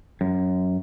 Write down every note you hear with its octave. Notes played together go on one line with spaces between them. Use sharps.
F#2